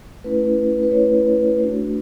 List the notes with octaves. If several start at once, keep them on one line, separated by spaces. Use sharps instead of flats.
A3 C#4 E4 B4
B4
A3 C#4 E4 C#5
A3 D4 F#4